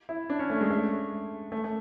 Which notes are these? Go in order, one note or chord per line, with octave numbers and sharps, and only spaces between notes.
E4
D4
C#4
A3
G#3
A3
A3
A3